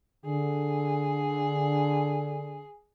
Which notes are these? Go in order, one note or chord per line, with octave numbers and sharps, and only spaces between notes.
D3 G#4